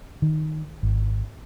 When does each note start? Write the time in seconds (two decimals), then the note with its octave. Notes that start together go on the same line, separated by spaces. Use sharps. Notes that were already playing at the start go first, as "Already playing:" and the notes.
0.22 D#3
0.83 G#1